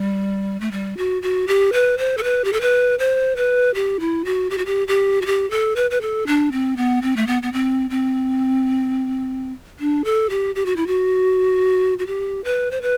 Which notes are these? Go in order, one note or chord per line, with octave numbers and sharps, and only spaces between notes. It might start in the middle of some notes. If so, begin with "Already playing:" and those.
Already playing: G3
A3
G3
F#4
F#4
G4
B4
C5
A4
B4
G4
A4
B4
C5
B4
G4
E4
F#4
G4
F#4
G4
G4
F#4
G4
A4
B4
B4
A4
D4
C4
B3
C4
A3
B3
B3
C4
C4
D4
A4
G4
G4
F#4
E4
F#4
F#4
G4
B4
C5
B4